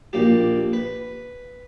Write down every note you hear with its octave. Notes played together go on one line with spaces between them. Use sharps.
A#1 A#3 G4
B4